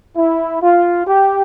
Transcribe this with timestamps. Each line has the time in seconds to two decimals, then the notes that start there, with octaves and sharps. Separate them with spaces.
0.17 E4
0.63 F4
1.08 G4